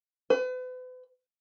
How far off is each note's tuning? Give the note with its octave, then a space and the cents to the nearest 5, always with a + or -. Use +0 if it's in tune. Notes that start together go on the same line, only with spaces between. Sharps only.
B4 +40